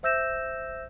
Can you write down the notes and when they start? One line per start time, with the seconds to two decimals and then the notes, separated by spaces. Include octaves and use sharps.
0.03 C5 E5 E6 G6 A#6 E7